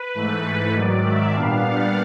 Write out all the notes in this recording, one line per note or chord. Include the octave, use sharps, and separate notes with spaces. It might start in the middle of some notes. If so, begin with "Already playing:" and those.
Already playing: B4
G#2 E3 A3
B4
G#2 D#3 F#3 D5
E5
A#2 G3 B3 D4 F5
F#5